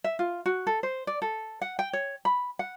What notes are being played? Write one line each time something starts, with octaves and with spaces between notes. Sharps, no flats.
E5
F4
F#4
A4
C5
D5
A4
F#5
G5
C#5
B5
F#5